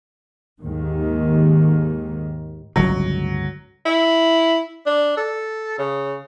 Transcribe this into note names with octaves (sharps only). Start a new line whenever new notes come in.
D#2 G#2 D#3
G1 C#2 A2 F#3
E4
D4
A4
C#3